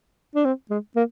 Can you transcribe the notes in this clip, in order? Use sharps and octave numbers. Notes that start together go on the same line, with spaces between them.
D4
C4
G#3
A#3